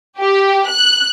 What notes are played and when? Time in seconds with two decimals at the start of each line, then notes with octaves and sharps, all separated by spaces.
0.19 G4
0.69 F#6